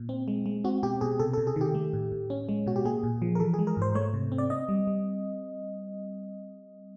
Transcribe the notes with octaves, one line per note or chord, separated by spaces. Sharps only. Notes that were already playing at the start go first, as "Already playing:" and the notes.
Already playing: A#2
C4
G#3
G#3
C4 F#4
B2 G4
B2 G#4
C3 A4
A4
C3
G#4
D#3 G4
A3
A2
A2
C#4
G#3
B2 F#4
G4
A#3 G#4
A#2
F3
A#4
E3 A4
G#4
G#3
A#4
G#2 C5
A3 C#5
C3
C4
D5
C4 D#5
G3
G3